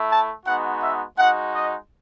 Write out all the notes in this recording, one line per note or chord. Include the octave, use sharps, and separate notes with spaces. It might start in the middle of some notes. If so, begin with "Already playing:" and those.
Already playing: A3 E4
A5
G#3 B3 D#4 F#4 F#5
E5
G#3 D#4 F#4 F#5
D#5